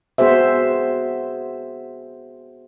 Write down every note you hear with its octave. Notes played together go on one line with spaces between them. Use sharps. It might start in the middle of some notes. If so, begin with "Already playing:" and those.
B3 F#4 G#4 C5 E5